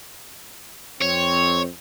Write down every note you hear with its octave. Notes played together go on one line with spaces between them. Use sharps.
F2 C4 C#5